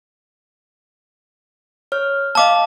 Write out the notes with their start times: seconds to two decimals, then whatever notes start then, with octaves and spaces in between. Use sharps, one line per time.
1.92 C#5 F6
2.35 D#5 F5 A5 D6 E6